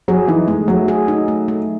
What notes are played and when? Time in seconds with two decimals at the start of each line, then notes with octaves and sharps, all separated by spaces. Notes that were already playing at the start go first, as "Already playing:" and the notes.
0.08 F#3 G#4
0.28 E3 D#4
0.48 G#3 A3
0.68 F#3 A3
0.88 G#4
1.08 D#4
1.28 A3
1.48 A3